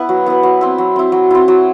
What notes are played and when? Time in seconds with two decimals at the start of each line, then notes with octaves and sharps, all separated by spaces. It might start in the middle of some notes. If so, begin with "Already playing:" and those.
Already playing: B3 E4 B4
0.09 F#3
0.26 B3 E4 B4
0.43 F#3
0.61 C4 E4
0.78 F#3
0.96 C4 E4
1.12 F#3
1.31 C4 E4
1.48 F#3